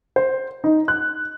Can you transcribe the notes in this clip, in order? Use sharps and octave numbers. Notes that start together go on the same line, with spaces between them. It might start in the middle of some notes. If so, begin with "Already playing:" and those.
C5
D#4
F#6